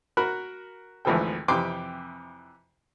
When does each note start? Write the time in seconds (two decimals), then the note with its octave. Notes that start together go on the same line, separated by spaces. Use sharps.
0.17 F#4 A#4 B5 F#6
1.05 G#1 D2 E3 F3 A4 G5
1.48 F2 C3 E3 G5 C6 D6